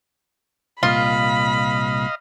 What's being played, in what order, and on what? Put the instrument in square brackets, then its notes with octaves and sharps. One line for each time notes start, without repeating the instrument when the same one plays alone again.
[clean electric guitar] C2 A#2 [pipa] F4 [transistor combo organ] D#5 F5 [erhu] B5